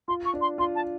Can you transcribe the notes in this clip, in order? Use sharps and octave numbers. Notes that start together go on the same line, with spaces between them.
F4 C6
C#6
D4
C6
F4 C6
A5